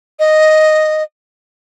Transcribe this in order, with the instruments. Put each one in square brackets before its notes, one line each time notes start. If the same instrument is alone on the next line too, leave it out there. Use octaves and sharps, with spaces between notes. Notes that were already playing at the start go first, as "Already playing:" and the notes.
[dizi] D#5